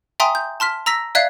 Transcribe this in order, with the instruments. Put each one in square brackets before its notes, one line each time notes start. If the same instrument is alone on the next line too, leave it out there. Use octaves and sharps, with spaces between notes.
[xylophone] E5 G5 G#5 A#5 C6 D#6
G6
A5 C6 F6 B6
A#5 E6 A#6 B6
D5 E5 F5 F#6 G#6 C7